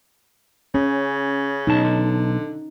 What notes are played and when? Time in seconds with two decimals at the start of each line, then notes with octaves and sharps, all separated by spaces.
0.74 C#3 C#4
1.67 B1 D#4 A5
1.84 D3